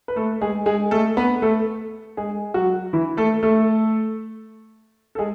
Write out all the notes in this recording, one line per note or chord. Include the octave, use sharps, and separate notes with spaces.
B4
A3 A4
G#3 G#4
G#3 G#4
A3 A4
B3 B4
A3 A4
G#3 G#4
F#3 F#4
E3 E4
A3 A4
A3 A4
A4
G#3 G#4